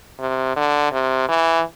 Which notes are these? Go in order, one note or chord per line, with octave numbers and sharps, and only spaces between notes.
C3
D3
C3
E3